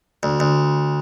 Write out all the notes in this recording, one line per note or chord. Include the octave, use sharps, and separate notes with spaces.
D2
D2